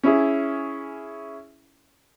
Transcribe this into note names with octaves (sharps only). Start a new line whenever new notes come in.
C#4 E4 G#4